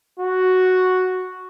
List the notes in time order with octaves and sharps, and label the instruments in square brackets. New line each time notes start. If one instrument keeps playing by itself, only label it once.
[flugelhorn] F#4